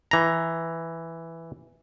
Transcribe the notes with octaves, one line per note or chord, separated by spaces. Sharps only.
E3 A#5